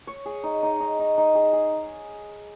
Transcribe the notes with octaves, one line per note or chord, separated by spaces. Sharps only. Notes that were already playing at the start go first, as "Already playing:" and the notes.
C#5
G#4
D#4
D#4
D#4
D#4
D#4
G#4
G#4